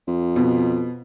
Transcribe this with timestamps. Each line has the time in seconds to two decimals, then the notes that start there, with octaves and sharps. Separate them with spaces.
0.08 F2
0.36 B2